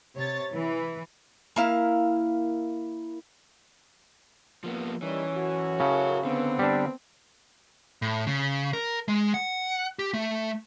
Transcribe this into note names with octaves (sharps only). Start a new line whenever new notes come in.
C3 C#5 A6
E3
A#3 E4 F5
F3 A#3 B3
D#3 E3 G3 C#4
F#2 A2 F#4
C#3 A#4 A5
D3 B3 C4
G3 D4
A2
C#3
A#4
G#3
F#5
G4
A3